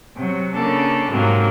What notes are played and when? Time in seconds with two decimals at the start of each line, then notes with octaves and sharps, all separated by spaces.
0.16 C3 F#3
0.53 C#3 A#3 D4 A4
1.09 G#2 C3 F#3 A#3